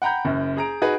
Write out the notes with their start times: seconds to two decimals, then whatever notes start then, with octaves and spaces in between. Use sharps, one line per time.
0.02 F#5 G5 A#5 B5 G6
0.25 F#1 F#2
0.57 G#4 A#5 D7
0.82 D#4 F#4 G#4 B4